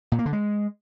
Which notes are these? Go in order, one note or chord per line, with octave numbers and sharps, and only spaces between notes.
A#2
A#3
D3
G#3